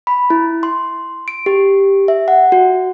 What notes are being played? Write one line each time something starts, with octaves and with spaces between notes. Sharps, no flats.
B5
E4
C6
D7
G4
E5
F#5
F#4